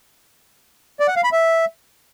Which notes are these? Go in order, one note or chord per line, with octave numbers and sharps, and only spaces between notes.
D5
F#5
F5
B5
E5